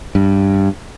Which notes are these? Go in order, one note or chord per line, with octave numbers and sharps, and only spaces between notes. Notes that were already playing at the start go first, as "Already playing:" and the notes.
G2